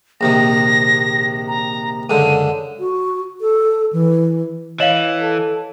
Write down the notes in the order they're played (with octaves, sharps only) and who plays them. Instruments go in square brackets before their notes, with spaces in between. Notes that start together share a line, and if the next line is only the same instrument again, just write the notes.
[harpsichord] A#1 C3 D#3 [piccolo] A#6
[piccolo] A#5
[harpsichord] C#2 F#2 D3 [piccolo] D#7
[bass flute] F#4
A4
E3
[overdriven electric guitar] E3 [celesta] C#5 E7 F#7 [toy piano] D#5 F5
[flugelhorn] A4